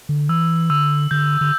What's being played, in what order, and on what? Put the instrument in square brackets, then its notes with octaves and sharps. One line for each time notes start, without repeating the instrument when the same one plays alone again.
[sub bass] D3
[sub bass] E3 [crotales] E6
[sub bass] D3 [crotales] E6
[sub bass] D3 [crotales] G6
[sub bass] D3